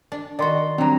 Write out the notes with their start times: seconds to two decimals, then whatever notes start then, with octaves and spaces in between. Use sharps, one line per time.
0.12 D4
0.39 D#3 F#4 D5 C6
0.78 F#3 G3 C4 D4 A#5